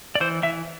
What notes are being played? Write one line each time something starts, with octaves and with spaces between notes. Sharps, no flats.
D5
E3 C5
E3 E5